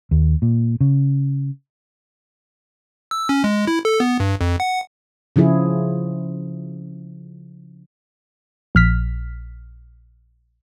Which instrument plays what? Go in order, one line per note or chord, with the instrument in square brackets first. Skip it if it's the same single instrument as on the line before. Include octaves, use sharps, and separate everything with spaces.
[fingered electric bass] D#2
A#2
C#3
[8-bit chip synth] E6
C#4
G#3
E4
A4
B3
G2
F2
F#5
[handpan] C#3 F3 E4 G#4
[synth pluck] A#1 F6 B6